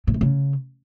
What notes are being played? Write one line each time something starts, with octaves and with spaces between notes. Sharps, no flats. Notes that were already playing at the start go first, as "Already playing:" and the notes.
A2
C3
C#3